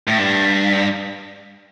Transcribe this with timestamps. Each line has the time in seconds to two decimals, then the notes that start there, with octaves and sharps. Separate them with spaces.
0.07 A2
0.18 G2